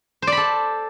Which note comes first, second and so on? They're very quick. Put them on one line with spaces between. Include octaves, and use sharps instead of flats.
C5 D5 B5 A4